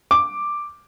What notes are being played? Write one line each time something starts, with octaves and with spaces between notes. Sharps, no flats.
D6